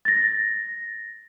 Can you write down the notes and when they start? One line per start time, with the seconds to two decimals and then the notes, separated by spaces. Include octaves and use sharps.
0.05 A6 A#6